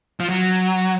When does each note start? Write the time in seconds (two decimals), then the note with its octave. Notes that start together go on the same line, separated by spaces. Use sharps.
0.20 F3
0.30 F#3